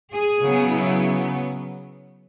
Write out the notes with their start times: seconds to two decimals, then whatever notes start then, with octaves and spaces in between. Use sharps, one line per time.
0.11 G#4
0.41 C#3 F#3 B3
0.70 E4